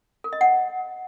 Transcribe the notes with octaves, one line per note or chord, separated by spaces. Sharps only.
A#4
D#5
F#5